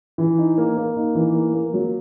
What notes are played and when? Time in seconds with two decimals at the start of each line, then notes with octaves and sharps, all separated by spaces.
0.18 E3
0.38 D#4
0.58 A#3
0.77 A#3
0.96 D#4
1.15 E3
1.34 A#3
1.53 A#3
1.74 F#3